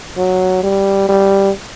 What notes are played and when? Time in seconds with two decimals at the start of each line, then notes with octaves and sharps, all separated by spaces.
0.17 F#3
0.63 G3
1.09 G3